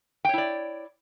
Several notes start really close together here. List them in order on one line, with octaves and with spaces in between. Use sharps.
G5 C#5 E4 D5